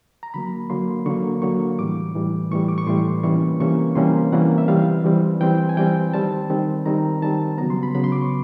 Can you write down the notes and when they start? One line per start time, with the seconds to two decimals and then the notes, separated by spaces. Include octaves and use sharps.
0.23 A#5
0.34 D3 F#3 A#3 B5
0.70 D3 F#3 A#3 C6
1.06 D3 F#3 A#3 C#6
1.42 D3 F#3 A#3 C#6
1.79 A2 E3 G3 D6
2.15 A2 E3 G3
2.51 A2 E3 G3 C#6
2.68 D6
2.78 C#6
2.87 A2 E3 G3 C6
3.23 C3 E3 G3 A#3 C#4 C#6
3.60 C3 E3 G3 A#3 C#4 C#6
3.95 C3 E3 G3 A#3 C#4 C6
4.32 C3 E3 G3 A#3 C#4 F#5
4.58 E5
4.68 E3 G3 C4 F5
5.04 E3 G3 C4
5.41 E3 G3 C4 G5
5.69 G#5
5.77 E3 G3 C4 G5
6.14 D#3 G3 C4 A5
6.50 D#3 G3 C4
6.86 D#3 G3 C4 A#5
7.22 D#3 G3 C4 A5
7.58 B3 A#5
7.61 C#3 F#3
7.70 C6
7.83 B5
7.95 C#3 F#3 B3 B5
8.04 C6
8.12 D6
8.22 C#6